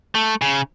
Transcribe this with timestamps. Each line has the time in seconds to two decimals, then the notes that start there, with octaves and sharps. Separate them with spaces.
0.15 A3
0.42 C#3